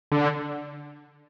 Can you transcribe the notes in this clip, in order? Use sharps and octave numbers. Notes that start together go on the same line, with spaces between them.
D3